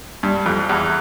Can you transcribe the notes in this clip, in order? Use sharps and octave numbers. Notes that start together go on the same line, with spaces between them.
G2
F2
E2